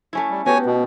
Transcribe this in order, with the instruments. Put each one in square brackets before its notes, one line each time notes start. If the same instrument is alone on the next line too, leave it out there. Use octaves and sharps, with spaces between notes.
[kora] A3 C#4 E4
[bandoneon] G3
[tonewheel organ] B3 [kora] F#4 G4 A4 [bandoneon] C#5 G#5
[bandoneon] B2